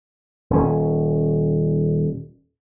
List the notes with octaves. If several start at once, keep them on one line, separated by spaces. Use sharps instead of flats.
D#1 C#4